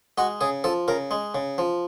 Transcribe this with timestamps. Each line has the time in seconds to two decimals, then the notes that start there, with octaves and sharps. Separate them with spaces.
0.18 G#3 F#4
0.41 C#3 G#4
0.64 F3 A4
0.88 C#3 A#4
1.11 G#3
1.35 C#3
1.58 F3